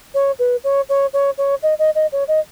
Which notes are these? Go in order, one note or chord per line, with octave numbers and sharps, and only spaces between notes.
C#5
B4
C#5
C#5
C#5
C#5
D#5
D#5
D#5
C#5
D#5